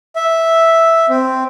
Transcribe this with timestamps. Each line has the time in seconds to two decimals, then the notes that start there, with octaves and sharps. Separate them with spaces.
0.16 E5
1.09 C4